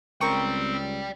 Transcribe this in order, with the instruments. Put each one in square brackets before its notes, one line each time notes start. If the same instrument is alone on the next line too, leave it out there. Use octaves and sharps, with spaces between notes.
[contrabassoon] C#2 [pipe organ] C4 [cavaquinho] A#4 C5 C#6 [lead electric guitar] D5 G5